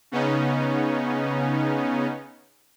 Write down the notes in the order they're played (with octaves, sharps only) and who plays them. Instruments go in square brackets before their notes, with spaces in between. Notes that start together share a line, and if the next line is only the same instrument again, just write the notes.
[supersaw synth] C#3 B3 C#4 D#4